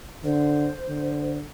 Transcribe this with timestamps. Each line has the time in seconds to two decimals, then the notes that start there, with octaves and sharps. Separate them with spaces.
0.24 D3 C5
0.88 D3